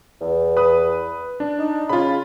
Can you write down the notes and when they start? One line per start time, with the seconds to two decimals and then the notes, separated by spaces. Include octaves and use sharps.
0.21 E2
0.57 B4 D#6
1.40 D4
1.59 D#4
1.89 C#3 F4 B5